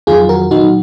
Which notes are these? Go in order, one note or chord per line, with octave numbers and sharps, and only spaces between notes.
F2 D#3 F#3 F4 G#4
F#4 A#4
A#2 F#3 D#4 F#4